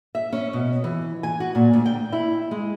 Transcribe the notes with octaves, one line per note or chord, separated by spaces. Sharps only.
E5
C#4
B2
E3
G#5
F#4
A#2
D2
G5
E4
G#3